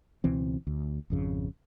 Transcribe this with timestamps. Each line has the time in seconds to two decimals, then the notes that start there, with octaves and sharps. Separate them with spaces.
0.24 C#2 B2 E3 C4
0.67 D2
1.10 G#1 F2 C#3